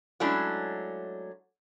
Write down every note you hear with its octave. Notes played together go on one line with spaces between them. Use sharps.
F#3 G#3 A3 C#4 D4 E4